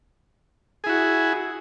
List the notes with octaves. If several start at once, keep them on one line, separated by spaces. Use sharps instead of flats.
E4 F#4 G#4